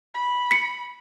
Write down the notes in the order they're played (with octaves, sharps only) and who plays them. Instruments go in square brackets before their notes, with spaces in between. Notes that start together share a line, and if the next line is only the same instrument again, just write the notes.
[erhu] B5
[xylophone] B6 C#7